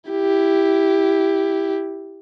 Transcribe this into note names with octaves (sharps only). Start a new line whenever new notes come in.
E4 G4